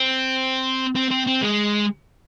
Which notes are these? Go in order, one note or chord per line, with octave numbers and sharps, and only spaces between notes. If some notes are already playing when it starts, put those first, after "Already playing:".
Already playing: C4
C4
C4
C4
G#3